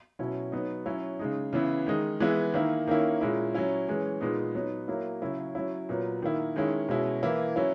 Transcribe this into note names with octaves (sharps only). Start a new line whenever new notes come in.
B2 F#3 C#4 E4
F#3 B3 D#4
F#3 C#4 E4
C#3 G#3 D#4
C#3 E3 B3 E4
D#3 G#3 D#4
E3 G#3 B3 E4
D#3 A#3 E4
D#3 A#3 C#4 E4
A#2 G#3 C#4 E4
F#3 C#4 E4
E3 G#3 C#4
A#2 G#3 B3 D#4
F#3 B3 D#4
F#3 A#3 E4
C#3 F#3 C#4 E4
F#3 C#4 E4
A#2 F#3 B3
D#3 A#3 E4
D#3 G#3 C#4 E4
B2 G#3 C#4 E4
E3 A#3 E4
F#3 C#4 E4